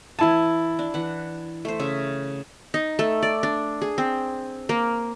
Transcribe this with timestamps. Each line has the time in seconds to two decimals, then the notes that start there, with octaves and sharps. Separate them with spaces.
0.19 E3 E4 G#5 A5
0.79 D4
0.94 E3 F#5
1.65 A3 C5
1.79 C#3 E5
2.74 D#4
2.99 A3
3.23 D5
3.43 D4
3.82 G#4
3.98 C4
4.69 A#3